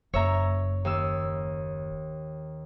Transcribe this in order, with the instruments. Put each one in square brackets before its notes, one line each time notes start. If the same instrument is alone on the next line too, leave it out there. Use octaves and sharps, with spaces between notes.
[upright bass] F#1 [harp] C#5 E5 A#5
[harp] D#2 E6